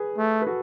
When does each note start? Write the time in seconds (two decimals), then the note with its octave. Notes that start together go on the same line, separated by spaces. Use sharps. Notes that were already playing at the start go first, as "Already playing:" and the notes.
Already playing: G#4 B4
0.18 A3
0.42 B4
0.47 F#4 A4